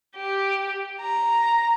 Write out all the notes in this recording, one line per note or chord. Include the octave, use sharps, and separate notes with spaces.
G4
A#5